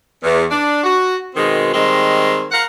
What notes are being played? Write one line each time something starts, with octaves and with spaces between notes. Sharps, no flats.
E2
D4
F#4
B2 D#3 G#3 C4
D#3 G3 G#3 C4
A#4 F5 F#5